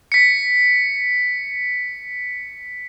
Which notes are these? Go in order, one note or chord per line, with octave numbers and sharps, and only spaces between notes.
B6 C#7